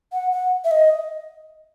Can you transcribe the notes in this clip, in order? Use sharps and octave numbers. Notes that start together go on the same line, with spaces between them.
F#5
F#5
E5
D#5